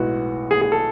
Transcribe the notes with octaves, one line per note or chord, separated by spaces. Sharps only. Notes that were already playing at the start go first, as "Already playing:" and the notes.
Already playing: B1 A2 G#3 B3 F#4
G#4
G#4
A4